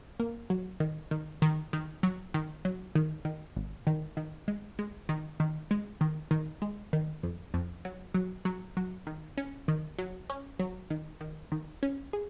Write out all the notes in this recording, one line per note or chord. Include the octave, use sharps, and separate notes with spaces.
A#3
F#3
D#3
D#3
D#3
D#3
F#3
D#3
F#3
D#3
D#3
G#1
D#3
D#3
G#3
G#3
D#3
D#3
G#3
D#3
D#3
G#3
D#3
F2
F2
F#3
F#3
F#3
F#3
D#3
C#4
D#3
F#3
C#4
F#3
D#3
D#3
D#3
C#4
G#4